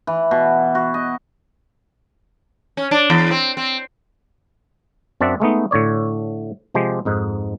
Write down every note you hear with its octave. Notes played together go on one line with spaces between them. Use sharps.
E3
B2
F#4
D#5
C#4
D4
E2
C4
C4
F#2 C4 D4 D5 E5 F#5
G#3 A3 B3 D#4
A2 D3 C#5 D5
C3 F3 G#3 G4
F2 G#2 D#4